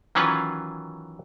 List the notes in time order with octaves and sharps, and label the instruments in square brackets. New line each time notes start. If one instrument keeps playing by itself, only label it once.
[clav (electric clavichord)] D#3 E3 F#3 C#4 F4 B4